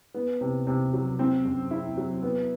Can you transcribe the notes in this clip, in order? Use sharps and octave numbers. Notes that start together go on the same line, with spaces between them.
B3
C3
C3
F#3
C4
F#2
E4
F#3
B3